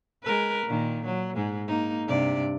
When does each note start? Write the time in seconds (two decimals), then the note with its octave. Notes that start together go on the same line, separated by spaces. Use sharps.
0.24 G#3 A#4 B4
0.67 A#2 D#3
1.06 F#3
1.36 G#2 G#3
1.67 A#3 D#4
2.07 G2 C3 D5